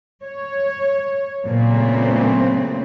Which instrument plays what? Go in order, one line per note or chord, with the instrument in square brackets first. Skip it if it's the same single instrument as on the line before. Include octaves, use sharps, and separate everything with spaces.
[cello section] C#5
A#2 C#3 F#3 A3 B3 C4